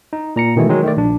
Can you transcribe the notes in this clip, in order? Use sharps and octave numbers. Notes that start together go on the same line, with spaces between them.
D#4
A#2 A#5 C#7
B2 D#3 E3 G#3 A3
D#3 F#3 G#3
D#3 A3 D5
A#1 D4